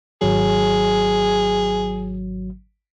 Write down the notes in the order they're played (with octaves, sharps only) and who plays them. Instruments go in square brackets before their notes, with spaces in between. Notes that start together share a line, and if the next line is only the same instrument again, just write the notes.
[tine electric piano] G#1 F#3 [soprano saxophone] G#4